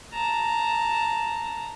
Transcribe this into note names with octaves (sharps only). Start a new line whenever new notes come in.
A5 A#5